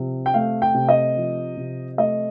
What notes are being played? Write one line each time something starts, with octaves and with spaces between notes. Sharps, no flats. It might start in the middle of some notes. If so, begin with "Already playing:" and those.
Already playing: C3 F3
G5
A3 F5
G5
C3
D#5
F3
C3
A3 D#5